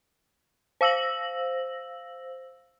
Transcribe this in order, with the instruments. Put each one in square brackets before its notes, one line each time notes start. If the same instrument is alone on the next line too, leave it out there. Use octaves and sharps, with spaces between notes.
[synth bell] C5 F5 E6 A#6 F#7